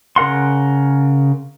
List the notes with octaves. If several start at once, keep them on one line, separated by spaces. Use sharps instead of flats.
C#3 A#4 F#5 C6